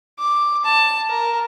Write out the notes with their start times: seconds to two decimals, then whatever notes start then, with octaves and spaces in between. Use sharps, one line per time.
0.19 D6
0.65 A5
1.09 A#4